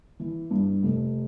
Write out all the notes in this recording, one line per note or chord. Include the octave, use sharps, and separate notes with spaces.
E3
G2
F1